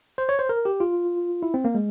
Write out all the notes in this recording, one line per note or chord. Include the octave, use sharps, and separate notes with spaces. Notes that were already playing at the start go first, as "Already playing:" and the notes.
C5
C#5
C5
A#4
G4
F4
E4
C4
A#3
G#3